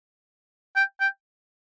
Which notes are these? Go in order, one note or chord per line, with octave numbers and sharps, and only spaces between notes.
G5
G5